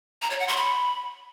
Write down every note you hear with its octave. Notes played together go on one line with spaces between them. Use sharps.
A#5
C#5
F#5
C6
B5